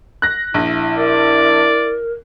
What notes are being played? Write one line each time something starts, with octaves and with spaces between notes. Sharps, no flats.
F#6 A#6
A#1 E4
A#4 D5